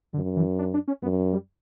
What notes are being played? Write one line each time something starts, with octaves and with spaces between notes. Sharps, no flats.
F#2 D3
E3
D4
D4
C#4
F#2 B3
G3